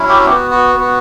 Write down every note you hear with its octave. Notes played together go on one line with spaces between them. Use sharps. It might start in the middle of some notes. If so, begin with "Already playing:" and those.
Already playing: F#3 C#4 E4
G4
B3 F#4 G4
F#4
B3 F#4